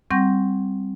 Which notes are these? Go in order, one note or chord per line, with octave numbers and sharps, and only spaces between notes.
G3 C4 F#5 C#6 G6 A#6